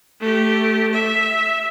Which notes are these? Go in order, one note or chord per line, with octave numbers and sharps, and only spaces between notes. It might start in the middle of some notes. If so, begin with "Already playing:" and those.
A3 G4
E5